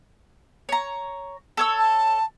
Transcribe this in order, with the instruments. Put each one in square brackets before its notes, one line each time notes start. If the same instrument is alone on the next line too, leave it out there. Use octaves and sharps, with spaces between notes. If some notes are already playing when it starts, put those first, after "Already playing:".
[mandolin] C#5 A#5
A4 C#5 E6
[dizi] A5